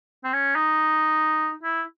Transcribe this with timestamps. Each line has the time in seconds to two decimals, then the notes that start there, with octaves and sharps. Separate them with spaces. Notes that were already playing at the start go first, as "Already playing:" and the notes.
0.24 C4
0.33 C#4
0.56 D#4
1.63 E4